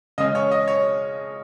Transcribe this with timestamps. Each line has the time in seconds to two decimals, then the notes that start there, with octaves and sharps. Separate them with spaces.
0.18 C#3 G#3 C#4 D#5
0.35 C#5
0.51 D#5
0.68 C#5